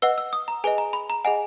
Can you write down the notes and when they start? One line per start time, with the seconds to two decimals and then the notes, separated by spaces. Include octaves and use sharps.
0.02 B4 D#5 F#5 E6
0.18 E6
0.33 D#6
0.48 A#5
0.64 G#4 B4 D#5 G#5
0.78 A#5
0.93 B5
1.10 A#5
1.25 G#4 D#5 F#5 G#5